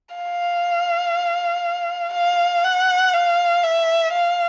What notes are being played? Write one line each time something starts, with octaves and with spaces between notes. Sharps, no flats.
F5
F5
F#5
F5
E5
F5